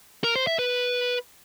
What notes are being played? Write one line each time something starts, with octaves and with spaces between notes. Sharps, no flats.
A#4
C5
E5
B4